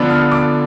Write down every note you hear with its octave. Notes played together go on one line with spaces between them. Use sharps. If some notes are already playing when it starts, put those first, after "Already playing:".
Already playing: D3 F3 B3 D4
F6
D6